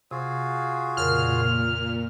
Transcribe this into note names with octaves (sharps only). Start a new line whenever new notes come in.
C3 F4 F#4 G#4
F2 A#2 C#3 A#4 F6